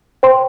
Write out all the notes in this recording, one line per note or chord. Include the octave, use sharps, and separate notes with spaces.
C5 G5 C6